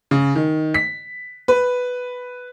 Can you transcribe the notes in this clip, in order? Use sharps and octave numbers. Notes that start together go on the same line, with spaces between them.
C#3
D#3
B6
B4